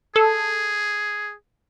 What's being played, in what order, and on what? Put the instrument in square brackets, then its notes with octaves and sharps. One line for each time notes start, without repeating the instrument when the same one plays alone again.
[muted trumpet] G#4 [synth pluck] A4